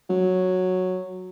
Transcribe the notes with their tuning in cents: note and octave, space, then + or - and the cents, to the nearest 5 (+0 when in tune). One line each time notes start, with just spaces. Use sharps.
F#3 -5